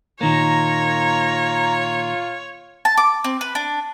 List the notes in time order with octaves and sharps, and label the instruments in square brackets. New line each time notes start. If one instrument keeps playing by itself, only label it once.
[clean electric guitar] A#2 D#3 A#3 [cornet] F4 [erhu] C#5 [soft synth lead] A#5
[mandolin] A5
D6
C4
B4
D4